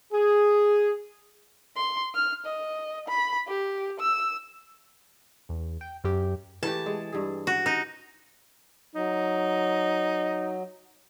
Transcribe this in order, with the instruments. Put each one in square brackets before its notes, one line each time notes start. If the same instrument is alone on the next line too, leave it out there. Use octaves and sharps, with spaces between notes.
[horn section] G#4
[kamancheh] C6
F6
D#5
B5
G4
E6
[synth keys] E2
G5
F#2 G4
[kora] E3 A3 G4 [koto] A5
[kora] G#3
G2 G#4
[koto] F#4
D#4
[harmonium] F#3 [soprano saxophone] D#4